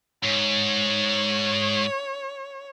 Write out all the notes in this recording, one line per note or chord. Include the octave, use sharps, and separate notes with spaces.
G#2 C#5